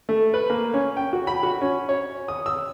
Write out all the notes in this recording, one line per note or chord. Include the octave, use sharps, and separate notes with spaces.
A3
B4
A#3
C#4
G5
F#4
B5
F#4
C#4
C#5
D#6
E6